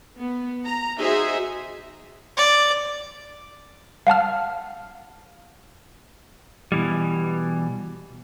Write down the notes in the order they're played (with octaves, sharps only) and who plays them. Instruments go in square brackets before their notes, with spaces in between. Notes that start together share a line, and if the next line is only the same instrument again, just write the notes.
[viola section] B3
A#5
D#4 F#4 G#4 C5 E5
[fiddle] D5
[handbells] F5 F#5 A5 F6
[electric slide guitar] B2 E3 G3